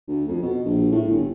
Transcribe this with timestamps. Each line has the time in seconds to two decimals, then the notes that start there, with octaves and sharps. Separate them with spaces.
0.07 D2
0.28 F2
0.42 B2
0.65 A#1
0.92 A2
1.09 G1